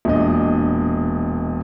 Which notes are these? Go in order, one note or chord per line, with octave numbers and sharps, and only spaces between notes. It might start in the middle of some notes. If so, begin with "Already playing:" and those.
E1 A#2 D4 D#5